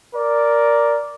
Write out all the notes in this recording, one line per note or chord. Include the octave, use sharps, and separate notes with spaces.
A#4 D5